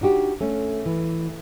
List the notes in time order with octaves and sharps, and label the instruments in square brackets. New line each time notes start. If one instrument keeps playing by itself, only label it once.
[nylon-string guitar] D4 D#4 F#4 G4
A3 C#4
E3